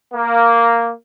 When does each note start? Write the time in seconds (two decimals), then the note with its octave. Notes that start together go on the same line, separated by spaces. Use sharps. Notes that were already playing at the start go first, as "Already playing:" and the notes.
0.14 A#3